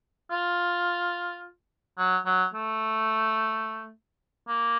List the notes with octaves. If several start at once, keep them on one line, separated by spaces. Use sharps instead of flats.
F4
F#3
F#3
A3
A#3